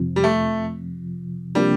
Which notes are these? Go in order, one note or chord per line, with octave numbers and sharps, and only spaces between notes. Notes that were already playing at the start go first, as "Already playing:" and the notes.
Already playing: F2 C3 F3
G3
A3
C3 F3 G3 A#3 D4 G4